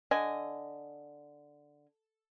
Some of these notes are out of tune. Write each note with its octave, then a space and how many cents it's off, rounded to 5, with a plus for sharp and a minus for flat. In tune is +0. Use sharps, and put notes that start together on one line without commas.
D3 +0 D#5 +0 G#5 +0